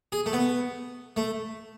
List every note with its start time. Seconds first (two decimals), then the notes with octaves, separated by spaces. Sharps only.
0.12 G#4
0.26 A3
0.33 B3
1.16 A3